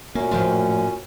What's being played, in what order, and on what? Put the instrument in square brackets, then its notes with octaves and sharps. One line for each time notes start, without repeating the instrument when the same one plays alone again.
[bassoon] F#2 [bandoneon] A#2 C#4 [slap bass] A#3
[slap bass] A2 F3 A3 [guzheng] F4 C5 G5